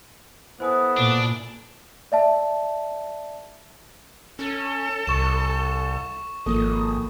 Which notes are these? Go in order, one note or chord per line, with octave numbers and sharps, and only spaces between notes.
B3 E4 A4 C5 G#5 D#6
A#2 D4
D5 E5 A5
C#4 A4
C2 C#6 E7
G#1 F3 A#3 A4 D#6